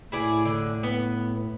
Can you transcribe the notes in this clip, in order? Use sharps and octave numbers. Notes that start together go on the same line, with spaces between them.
A2 E4 G#4 D5
D3
B3